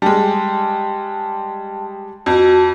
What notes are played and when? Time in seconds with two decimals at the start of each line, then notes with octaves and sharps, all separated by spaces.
0.02 G3 G#3 G5 A5
2.26 F2 F#4